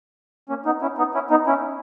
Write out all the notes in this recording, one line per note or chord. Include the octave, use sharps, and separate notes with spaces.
A#3 C#4
B3 D#4
C#4 E4
B3 D#4
C#4 E4
B3 D#4
C#4 E4